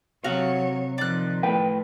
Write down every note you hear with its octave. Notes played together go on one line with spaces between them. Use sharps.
C3 F#3 F#4 C#5 F5
D#3 F3 D5 F#6
A2 B4 G5